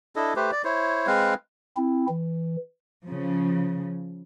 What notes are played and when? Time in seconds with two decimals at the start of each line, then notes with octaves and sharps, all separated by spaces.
0.16 D4 E4 A4 D#5
0.36 A3 G4 B4 C5
0.52 D5
0.64 E4 C5 C#5
1.07 G#3 C4 B4 F5
1.77 C4 E4
2.09 E3
3.05 C#3 F3